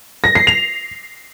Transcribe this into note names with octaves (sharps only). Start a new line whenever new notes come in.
A#6
C7
F7